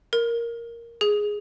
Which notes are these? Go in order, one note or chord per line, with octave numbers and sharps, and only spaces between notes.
A#4
G#4